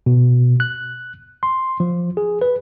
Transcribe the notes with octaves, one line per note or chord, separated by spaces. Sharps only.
B2
F#6
C6
F3
G#4
B4